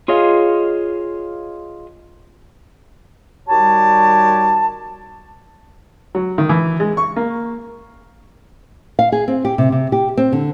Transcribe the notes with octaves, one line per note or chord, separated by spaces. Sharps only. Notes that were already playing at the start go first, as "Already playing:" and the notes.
F4 G#4 C#5 D#5 F5
D#3 G3 F#4 G4 C#5 A5
F#3
D#3
E3
G#3
C#6
A#3
F5
G#4
C4
G4
C3
C3
G4
C4
D3